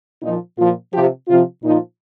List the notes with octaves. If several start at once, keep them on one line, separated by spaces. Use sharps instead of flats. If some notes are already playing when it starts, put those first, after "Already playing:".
A#2 F3 D#4
A#2 F3 F4
C3 F3 G4
C3 F3 F4
A#2 F3 D#4